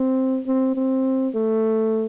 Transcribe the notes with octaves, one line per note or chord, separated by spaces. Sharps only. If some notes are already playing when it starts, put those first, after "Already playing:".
Already playing: C4
C4
C4
A3